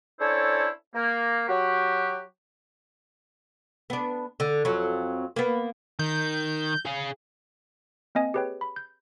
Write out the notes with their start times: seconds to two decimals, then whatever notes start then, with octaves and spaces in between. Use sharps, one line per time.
0.20 C#4 D4 E4 A4 C5 C#5
0.95 A#3
1.48 F#3 F#4 G4
3.90 B3 D4
4.40 D3
4.65 F2 F#3
5.36 A#3 B3
5.99 D#3 G6
6.85 G#4 F5
8.15 A#3 C4 D#5 G#5
8.34 G4 G#4 B4 C#5 G5
8.61 B5
8.76 G6